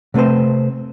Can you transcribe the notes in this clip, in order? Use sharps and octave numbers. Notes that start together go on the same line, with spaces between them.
C3 A3 C4 B4 C5